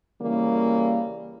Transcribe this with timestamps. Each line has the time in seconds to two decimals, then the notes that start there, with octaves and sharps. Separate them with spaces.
0.21 C#3 E3 G3 A#3